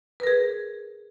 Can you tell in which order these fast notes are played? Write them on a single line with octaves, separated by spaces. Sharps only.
B4 A#4 G#4